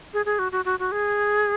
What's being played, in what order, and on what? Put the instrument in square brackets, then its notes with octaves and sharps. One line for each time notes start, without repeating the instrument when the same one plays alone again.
[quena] G#4
G#4
F#4
F#4
F#4
F#4
G#4